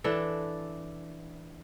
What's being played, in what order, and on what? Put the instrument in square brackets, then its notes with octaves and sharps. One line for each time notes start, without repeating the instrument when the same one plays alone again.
[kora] E3 D4 A4